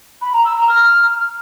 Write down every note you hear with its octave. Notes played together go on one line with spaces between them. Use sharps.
B5
A#5
E6
A#5
F6